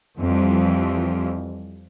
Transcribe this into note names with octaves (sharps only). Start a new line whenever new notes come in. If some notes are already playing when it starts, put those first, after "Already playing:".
F2 E3 F3 G3